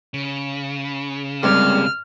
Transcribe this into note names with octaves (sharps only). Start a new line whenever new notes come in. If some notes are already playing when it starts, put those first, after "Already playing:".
C#3
G2 C3 G#3 A#3 F6